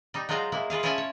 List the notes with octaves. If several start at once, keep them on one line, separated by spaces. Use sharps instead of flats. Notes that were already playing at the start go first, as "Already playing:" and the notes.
G3 D#4
F#3 G#3 F4 C5 F5 A#5
G#3 A#3 E4
E4 F4 G#4 F5
C#4 E4 F4 C#5 G#5 A5
C#5